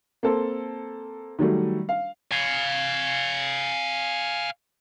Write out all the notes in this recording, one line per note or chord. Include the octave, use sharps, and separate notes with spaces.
A#3 C4 A4
D#3 F#3 G3 A3
F5
F5 G#5